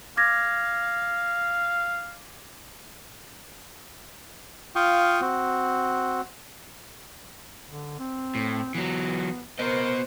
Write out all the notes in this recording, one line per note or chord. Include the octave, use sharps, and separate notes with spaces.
F5 D6 G#6 A#6
F4 F5 G5 C#6 D#6
C4 F#4
D3
C4
A2
E3 F#3 B3
B3 A#4 C5 D#5